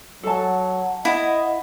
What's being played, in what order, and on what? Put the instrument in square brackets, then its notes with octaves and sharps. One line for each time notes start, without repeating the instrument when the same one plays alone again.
[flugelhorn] F#3 [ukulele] A4 A5 [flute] F#5
[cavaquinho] E4 [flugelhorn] D#5